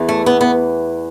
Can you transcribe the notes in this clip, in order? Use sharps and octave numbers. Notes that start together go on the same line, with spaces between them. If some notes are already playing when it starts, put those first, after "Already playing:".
Already playing: E2 E3
A3
B3
B3